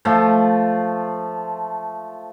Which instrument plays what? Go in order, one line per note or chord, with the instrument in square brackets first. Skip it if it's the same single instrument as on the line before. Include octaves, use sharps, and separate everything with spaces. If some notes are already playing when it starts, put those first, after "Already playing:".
[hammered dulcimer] F3 A3